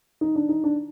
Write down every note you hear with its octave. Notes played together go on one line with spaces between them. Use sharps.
D#4
D4
D#4
D4